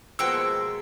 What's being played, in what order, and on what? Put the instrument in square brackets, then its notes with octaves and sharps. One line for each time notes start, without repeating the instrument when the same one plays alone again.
[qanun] B2 F3 A#3 [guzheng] G#3 [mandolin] F#4 G5 C#6 [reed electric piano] E6